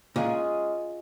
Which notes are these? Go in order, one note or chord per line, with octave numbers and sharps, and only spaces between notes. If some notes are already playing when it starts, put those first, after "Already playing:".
A#2 G#3 C#4 F4 G#4